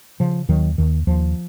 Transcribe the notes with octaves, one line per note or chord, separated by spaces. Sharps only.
C#3 F3
D#2 D#3 F#3
D#2 D#3
D#2 F3